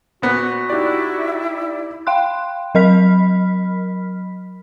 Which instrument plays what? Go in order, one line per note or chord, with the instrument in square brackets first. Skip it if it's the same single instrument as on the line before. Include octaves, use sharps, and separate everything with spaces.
[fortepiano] A#2 B3 [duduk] F#4
[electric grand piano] D#4 G4 D5 [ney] E4
[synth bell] F5 G5 C6 F#6
F#3 A#4 D#5 B5 F6 B6